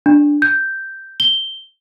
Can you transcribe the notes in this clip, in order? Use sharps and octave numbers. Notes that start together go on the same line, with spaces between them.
D4
G6
G7